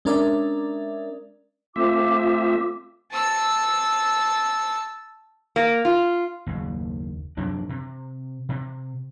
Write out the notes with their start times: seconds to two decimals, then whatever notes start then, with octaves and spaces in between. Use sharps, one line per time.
0.05 G#3 C#4 D4 A#4 D5 E5
1.76 A3 C4 F4 E5 D6 D#6
3.12 A5 E6
5.56 A#3
5.85 F4
6.47 F#1 D#2
7.37 F#2 C3 F#3 D4
7.69 C3
8.49 C3